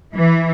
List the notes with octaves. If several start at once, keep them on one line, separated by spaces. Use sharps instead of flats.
E3